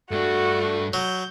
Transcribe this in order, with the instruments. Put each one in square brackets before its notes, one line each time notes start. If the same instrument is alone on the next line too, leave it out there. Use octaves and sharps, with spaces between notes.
[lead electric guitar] G2 D4 [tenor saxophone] A3 [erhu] F#4
[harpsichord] F#3 [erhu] G6